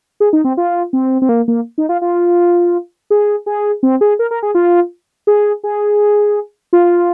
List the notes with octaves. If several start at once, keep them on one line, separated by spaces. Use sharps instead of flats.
G#4
D#4
C4
F4
C4
C4
A#3
A#3
D#4
F4
F4
G#4
G#4
C4
G#4
A#4
A#4
G#4
F4
G#4
G#4
F4